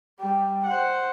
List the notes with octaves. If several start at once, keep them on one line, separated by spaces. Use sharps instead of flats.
G3 G5
C5 F#5